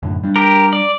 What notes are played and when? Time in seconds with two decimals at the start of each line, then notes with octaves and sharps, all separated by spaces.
0.03 F#2 A2 D3
0.24 G3 D4
0.36 G4 A#4
0.73 D5